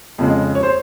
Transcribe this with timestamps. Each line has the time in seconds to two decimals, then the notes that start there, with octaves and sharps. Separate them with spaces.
0.18 F2 C#3 G#3
0.55 C#5
0.63 C5